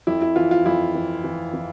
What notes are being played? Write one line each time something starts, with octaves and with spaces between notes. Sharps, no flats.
F2 E4
E4
E3 F4
F4
F2 E4
E3
E3
E3